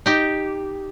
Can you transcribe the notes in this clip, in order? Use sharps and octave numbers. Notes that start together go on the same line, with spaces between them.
D#4 G4